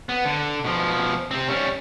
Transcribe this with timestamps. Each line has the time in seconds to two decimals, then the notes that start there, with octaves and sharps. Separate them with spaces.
0.09 B3
0.25 D3
0.65 B2 F3
1.31 C3 C4
1.48 G3 C#4